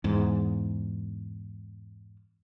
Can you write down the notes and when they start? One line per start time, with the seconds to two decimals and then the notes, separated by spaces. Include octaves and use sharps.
0.04 E2 G#2